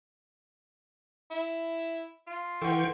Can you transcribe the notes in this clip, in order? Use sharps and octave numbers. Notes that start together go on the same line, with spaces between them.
E4
F4
E3 A4 F#5 G5 C#6